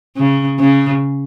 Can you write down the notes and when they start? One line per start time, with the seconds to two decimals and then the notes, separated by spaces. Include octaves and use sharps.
0.17 C#3
0.59 C#3